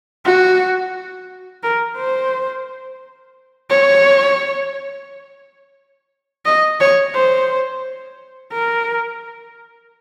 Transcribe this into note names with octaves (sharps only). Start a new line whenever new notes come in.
F#4
A#4
C5
C#5
D#5
C#5
C5
A#4